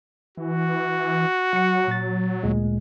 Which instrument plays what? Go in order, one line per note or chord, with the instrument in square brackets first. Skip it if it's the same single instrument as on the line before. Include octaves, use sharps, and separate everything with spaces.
[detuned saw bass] E3 [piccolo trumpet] F#4
[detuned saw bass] F#3 [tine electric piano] F#5 C#7
[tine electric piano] A#2 A6
D2 A#2 G#3